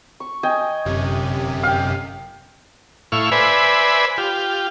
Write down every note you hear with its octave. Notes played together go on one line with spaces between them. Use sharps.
C#6
D#5 G5 G#5
G1 F#2 C3
F5 G5
A2 E4 F5 C#6
B4 C5 D5 E5 G#5 B5
F4 G4